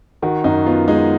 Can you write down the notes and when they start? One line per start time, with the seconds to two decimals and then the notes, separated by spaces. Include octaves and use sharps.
0.22 D#3 F#4
0.44 F#2 D#4
0.66 B3 F4
0.88 G#3 D#4